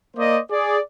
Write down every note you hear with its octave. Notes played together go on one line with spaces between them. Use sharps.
A#3 C5 D5 D#5
G#4 D5